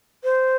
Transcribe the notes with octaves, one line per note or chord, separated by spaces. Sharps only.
C5